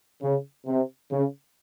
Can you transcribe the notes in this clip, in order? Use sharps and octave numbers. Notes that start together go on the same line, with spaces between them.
C#3
C3
C#3